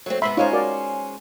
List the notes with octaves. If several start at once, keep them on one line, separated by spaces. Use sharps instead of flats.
F#3 A3 C4
G#2 C3 B3 E5 B5 C6
G#3 C#4 D#4 F4 C5 C#5
F#4 A#4 D5